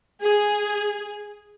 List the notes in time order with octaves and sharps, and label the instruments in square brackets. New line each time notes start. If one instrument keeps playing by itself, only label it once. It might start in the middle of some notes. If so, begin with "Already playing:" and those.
[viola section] G#4